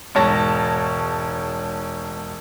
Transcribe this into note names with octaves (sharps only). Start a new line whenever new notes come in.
E1 G#2 C#5 A5 A#6